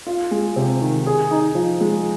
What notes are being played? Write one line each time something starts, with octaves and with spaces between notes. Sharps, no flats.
F4
G#3
C3
D#3
G#4
D#4
F3
G#3